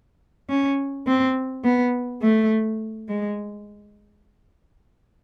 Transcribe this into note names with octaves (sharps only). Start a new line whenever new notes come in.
C#4
C4
B3
A3
G#3